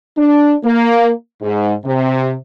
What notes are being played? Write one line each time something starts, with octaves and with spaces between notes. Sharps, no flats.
D4
A#3
G#2
C3